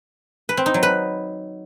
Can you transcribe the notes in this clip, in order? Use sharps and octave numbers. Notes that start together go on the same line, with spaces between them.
B4
C4
D#4
F#3
B4